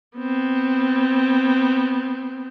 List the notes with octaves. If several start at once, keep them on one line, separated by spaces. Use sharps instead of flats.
B3 C4